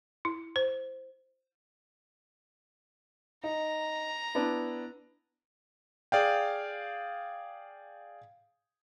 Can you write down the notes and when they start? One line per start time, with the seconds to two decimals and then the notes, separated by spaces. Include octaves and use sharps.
0.25 E4
0.56 C5
3.44 D#4 A#5
4.35 B3 D4 E4
6.12 G#4 D5 F5 G5